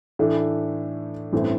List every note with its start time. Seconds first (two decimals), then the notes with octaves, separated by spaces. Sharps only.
0.19 A2 E3 A3 D4
1.32 A1 G2 E3 A3 C4